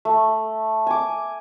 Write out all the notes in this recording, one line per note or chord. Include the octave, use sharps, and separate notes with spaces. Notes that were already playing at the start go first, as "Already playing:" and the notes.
A3
G#5 D6